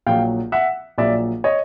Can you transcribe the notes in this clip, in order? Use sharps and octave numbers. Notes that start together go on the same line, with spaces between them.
A#1 A#2 F#3 F5 G5
E5 F#5
A#1 A#2 F#3 D5 E5
C#5 D#5